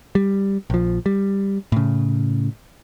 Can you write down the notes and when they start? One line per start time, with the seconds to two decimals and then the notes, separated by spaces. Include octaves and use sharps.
0.15 G3
0.70 A#1 F3
1.06 G3
1.72 A2 C#3